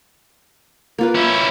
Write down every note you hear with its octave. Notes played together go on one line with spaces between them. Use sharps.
A#3 F4 B4
C#4 E4